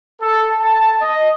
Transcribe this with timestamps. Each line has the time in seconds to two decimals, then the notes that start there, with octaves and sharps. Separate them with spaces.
0.22 A4
0.61 A5
1.01 D#5